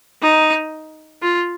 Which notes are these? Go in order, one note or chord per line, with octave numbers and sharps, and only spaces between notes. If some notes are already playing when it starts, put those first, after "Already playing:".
D#4
F4